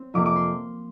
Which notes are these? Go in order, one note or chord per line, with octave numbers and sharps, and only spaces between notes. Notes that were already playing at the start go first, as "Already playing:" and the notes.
Already playing: C4
F2 C3 A#3 D6
D6
C6